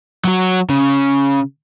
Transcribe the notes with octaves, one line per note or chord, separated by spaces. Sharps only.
F#3 F#4
C#3